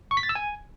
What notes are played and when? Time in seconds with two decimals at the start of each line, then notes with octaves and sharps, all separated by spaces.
0.11 C#6
0.17 B6
0.23 A6
0.29 E6
0.35 G#5